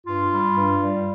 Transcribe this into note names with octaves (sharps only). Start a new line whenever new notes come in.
G2 F4
G3
G2
G3